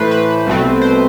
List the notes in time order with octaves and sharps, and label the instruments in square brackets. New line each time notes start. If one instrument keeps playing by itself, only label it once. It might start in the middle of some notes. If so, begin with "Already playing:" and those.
Already playing: [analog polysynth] A2 E3 A3 B4 C5
B4
C2 B2 A3 C4
C5